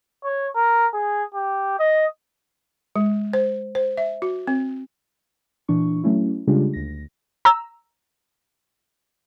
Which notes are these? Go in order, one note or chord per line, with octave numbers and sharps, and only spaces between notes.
C#5
A#4
G#4
G4
D#5
G#3
C5
C5
E5
F#4
C4
A#2 E3 D4 C#6
F#3 A3 C#4 E4
C#3 G3 G#3 D4 F4 G4
D2 A#6
A#5 E6